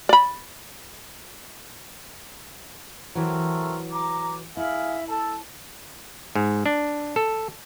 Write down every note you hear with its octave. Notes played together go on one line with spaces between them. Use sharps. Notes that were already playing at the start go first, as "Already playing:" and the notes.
D5 B5
E3 F#3 A3 C4 A#4
A#5 D6
E4 G#4 E5 F5
A4 A5
G#2
D4
A4